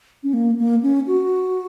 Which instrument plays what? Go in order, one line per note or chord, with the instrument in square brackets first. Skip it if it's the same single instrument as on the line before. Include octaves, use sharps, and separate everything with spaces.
[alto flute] C#4
A#3
A#3
C#4
F#4